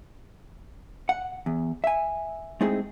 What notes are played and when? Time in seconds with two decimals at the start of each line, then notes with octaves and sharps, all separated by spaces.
1.09 F#5
1.46 E2
1.84 E5 G#5
2.61 G#3 A3 C4 D#4 E4 G#4